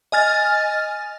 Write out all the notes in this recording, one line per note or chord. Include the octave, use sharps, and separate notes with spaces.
D#5 G#5 F6 A6